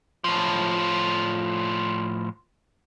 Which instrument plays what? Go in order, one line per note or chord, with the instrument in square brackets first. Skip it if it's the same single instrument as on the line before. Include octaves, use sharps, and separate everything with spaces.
[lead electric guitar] A2 F3